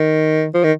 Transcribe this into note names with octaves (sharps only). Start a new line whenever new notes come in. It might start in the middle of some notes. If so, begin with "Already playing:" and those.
Already playing: D#3
F3
D#3